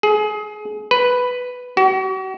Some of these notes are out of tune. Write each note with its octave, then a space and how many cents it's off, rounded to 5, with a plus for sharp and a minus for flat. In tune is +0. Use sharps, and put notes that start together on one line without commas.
G#4 +25
B4 +5
F#4 +40